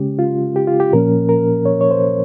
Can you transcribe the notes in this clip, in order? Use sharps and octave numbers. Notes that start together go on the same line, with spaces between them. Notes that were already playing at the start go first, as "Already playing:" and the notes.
Already playing: C#3 G#3 C#4 G4
F4
G4
F4
G4
A#2 F3 A#3 C#4 A#4
A#4
C#5
C#5
C5